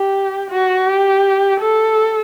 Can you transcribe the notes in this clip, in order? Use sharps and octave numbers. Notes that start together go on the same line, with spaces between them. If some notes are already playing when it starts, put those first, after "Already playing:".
Already playing: G4
F#4
G4
A4